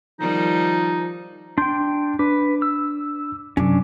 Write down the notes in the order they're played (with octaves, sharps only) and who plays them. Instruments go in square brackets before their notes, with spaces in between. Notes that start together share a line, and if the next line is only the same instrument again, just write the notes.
[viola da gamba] D#3 G3 [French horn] F3 [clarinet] D#4
[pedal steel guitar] D4 G5 [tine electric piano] C6 G6
[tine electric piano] D4 D6 [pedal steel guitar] B4
[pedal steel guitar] E6
[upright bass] F#2 C3 [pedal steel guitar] C#4 D4